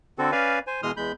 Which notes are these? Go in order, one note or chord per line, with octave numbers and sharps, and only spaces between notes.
D3 C4 F#4 A4
C#4 B4 D5 F5 G#5
C5 G#5
B2 E3 G#3 C6 D#6 F6
E2 G#3 B5 G6